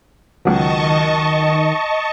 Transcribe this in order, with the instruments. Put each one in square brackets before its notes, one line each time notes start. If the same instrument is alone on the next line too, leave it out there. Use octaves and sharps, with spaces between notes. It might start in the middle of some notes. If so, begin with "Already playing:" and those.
[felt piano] C#2 F#3 [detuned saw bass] D#3 [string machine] D#5 A5 C#6